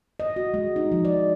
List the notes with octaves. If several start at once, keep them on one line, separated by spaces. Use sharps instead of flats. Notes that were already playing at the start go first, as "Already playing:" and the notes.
D#5
F#4
G#3
D#4
F3
D5